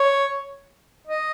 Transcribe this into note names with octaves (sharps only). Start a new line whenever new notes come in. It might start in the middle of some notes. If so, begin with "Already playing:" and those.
Already playing: C#5
D#5